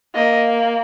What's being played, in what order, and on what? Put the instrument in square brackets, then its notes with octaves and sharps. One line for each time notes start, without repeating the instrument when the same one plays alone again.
[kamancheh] A#3 [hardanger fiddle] D#5